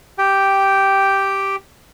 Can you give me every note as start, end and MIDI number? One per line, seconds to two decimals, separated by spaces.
0.18 1.56 67
0.18 1.56 79